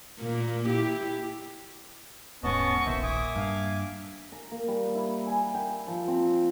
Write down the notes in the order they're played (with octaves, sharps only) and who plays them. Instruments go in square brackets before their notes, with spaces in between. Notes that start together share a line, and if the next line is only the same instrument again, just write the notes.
[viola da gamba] A#2 A#3
E4 G4
[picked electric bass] D#1 G#2 [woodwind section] B3 [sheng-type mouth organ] C#4 D#5 A5 [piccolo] C#6
[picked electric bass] D#1 A#1 D#2 [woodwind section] A#3 [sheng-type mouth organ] C5 E5
[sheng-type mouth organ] E5 G#5 D6 [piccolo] D#6
[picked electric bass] G2 [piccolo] F5
[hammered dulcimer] A#5
A#3
G3
E4
G#5
G5
F3
C4